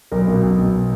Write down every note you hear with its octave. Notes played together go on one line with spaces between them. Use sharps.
B1 A#4
B2
B1
B2